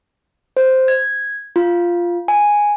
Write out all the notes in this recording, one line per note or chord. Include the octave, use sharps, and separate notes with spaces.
C5
G#6
F4
G#5